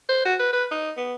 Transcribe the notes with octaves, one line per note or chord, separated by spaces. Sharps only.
C5
F#4
B4
B4
D#4
B3